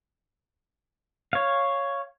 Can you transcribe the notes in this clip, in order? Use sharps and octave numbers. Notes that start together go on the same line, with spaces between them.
C#5 F5